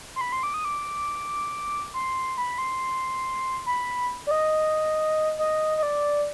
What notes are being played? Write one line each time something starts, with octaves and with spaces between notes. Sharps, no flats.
C6
B5
C6
D6
D#6
D6
C6
B5
C6
B5
D5
D#5
D#5
D#5
D5